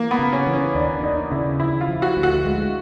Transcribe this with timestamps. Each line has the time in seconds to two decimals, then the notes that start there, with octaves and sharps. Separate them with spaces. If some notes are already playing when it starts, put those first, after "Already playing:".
Already playing: E3 A#3
0.11 B3
0.19 C#3
0.32 C#4
0.47 E3
0.54 C#4
0.75 D#2 D4
1.03 D#2 D#4
1.31 C#3 E4
1.60 F3 E4
1.81 F4
1.88 F3
2.02 F#4
2.17 D2
2.23 F#4
2.45 G#3